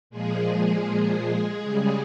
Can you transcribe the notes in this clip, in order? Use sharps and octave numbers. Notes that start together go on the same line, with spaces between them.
A#2 F3 G#3 G#4
C#3 G3